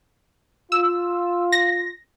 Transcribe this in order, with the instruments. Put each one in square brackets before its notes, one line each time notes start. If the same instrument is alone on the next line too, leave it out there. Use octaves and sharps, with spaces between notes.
[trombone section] F4 [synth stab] E6
[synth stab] A#6